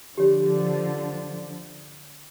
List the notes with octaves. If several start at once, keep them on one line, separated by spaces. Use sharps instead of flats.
D3 F3 G4 C#5